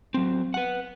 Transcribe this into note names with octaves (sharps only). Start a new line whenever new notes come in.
F#3 C4
B4 F#5